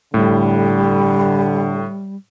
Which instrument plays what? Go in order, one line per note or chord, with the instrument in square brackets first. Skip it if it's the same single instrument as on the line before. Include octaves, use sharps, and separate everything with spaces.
[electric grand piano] A2 [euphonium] D3 [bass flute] G3